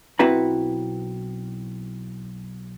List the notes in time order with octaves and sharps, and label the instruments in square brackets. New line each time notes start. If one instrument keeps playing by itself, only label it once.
[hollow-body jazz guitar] B1 C4 E4 F#4 B4 A#5